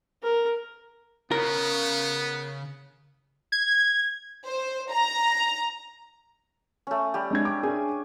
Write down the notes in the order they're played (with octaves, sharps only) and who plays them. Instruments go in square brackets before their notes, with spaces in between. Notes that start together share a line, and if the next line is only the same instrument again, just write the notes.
[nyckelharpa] A#4
[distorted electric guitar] C#3 [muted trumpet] B3 [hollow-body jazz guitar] A#4
[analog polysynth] G#6
[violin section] C5
A#5
[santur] A3 C#4
G3 G4
[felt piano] G#3 D4 G#6
D6
[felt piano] D4 G#4 [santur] G#5